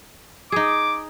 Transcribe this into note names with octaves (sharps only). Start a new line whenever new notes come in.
D#4 G#4 D6